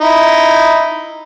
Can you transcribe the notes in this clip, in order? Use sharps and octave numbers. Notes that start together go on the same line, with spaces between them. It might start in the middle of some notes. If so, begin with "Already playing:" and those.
D#4 E4